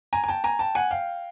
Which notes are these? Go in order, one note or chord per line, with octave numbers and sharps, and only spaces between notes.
G#5 A#5
G#5
G5 A5
G#5 A#5
G5 A5
F#5 G#5
F5 G5